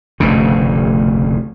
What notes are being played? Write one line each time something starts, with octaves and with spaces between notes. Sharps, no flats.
F1 D2 G2 C#3